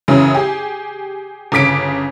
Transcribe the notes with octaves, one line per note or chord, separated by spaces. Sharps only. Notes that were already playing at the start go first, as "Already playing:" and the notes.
F#2 C#3 E3 F#3 C#4 E4
G4 G#4
G1 C#3 D6 B6 D7